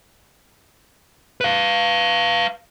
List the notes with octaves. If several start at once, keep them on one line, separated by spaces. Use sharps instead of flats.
B4 F5